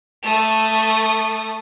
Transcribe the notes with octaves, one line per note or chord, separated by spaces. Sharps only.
A3 D#6